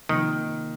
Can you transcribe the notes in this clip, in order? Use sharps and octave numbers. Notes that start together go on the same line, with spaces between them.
C3 D#3 F3 A#3